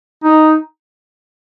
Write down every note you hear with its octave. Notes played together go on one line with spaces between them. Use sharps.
D#4